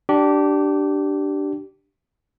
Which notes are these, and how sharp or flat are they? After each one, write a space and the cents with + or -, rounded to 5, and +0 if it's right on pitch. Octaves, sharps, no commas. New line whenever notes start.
D4 +0 G4 -20